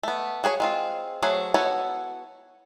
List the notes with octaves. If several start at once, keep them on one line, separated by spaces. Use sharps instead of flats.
A3 B3
F#4 G#4 A#4 C#5
G#3 C4 F4
F#3 A3 F#4 G#4 C5
B3 E4 F#4 A4 C#5